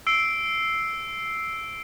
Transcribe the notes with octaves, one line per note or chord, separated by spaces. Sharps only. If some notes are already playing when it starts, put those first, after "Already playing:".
E6 C7 D7